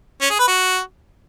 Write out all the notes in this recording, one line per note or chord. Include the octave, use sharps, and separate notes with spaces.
C#4
G#4
B4
F#4